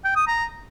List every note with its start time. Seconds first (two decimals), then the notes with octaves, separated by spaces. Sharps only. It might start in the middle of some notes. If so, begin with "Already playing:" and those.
0.05 G5
0.16 D#6
0.28 A#5